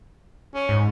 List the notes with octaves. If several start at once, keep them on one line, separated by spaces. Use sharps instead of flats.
C#4
G#2